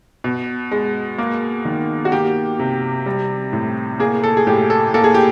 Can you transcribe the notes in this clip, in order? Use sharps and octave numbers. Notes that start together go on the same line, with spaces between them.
B2
G#3
A#3
D#3
F#4
A#3 G4
C3
G3
A2
A#3 G#4
A4
G#4
A2 G4
A4
A#3 A4
G#4
G4